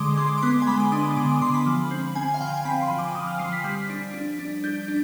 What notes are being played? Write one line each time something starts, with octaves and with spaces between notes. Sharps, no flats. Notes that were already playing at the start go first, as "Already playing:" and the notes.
Already playing: D3 G#3 C6 D6 D#6
G#3 C6
D6
B3 C6
G#5
G#3 B5
D6
D4 D#6
D#6
D3 D6
D6
D3 C6
B5
F3
C4
C4 G#5
G#5
F5
F3 G5
G#5
C4 B5
C6
F3
D6
F3 D#6
F6
F3 C7
B6
G3
D4
D4
D4
D4 G6
D4